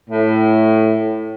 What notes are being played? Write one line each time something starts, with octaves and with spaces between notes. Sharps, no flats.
A2